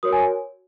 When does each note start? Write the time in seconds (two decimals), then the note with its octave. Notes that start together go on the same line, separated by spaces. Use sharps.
0.03 F#4 A#4 C#5 D#6
0.13 G#5